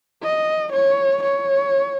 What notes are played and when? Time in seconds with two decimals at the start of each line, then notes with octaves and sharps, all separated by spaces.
0.22 D#5
0.72 C#5
1.23 C#5